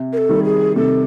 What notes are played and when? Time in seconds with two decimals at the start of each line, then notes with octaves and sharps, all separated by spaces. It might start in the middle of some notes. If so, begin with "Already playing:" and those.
Already playing: C3
0.13 A#4
0.18 A4
0.29 D#3 G3
0.44 G#4
0.76 C3 A4